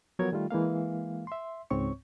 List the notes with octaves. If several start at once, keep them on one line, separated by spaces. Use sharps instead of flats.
F3 F#3 B3 A#4 C#5 G#6
D#3 G3 A3 F4
E3 G#3 A#3 F5
E5 C6
C#2 G#2 C4 C#5 C#6